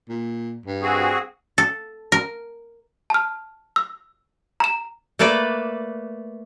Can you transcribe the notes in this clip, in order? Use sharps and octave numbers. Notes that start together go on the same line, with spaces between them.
A#2
G2
C4 F#4 G#4
A4
A#4
A5 F6
E6
A#5 E7
A3 A#3 A4 B4 D5